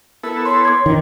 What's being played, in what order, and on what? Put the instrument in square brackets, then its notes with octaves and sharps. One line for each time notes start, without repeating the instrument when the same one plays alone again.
[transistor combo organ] B3 E4 A4 [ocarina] A#4
[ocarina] C#5 [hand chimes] C6
[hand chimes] D6 G#6
[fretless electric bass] D#3 [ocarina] D4